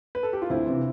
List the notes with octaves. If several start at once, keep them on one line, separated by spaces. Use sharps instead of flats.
B4
A4
G4
F4
D2 C4 E4
C3 E3